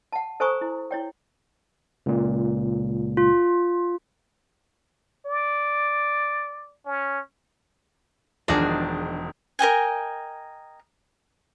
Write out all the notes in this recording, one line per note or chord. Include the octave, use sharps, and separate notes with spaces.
F#5 A5
A4 C5 G#5 A#5 C#6 D#6
E4
E4 C#5 G5
C#2 A#2
F4
D5
C#4
E1 D#3 F3 D4 F#4 G#4
A#4 D#5 G5 G#5